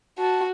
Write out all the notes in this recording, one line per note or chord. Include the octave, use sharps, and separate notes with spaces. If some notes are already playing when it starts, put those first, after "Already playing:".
F#4 A5